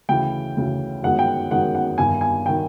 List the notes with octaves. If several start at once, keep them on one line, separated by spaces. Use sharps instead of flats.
D2 C#3 E3 G5
D2 C#3 E3
G1 F#2 D#3 G#3 F#5
G5
G1 F#2 D#3 G#3 F#5
F#5
G1 G2 D#3 G#5
G#5
D#3 G5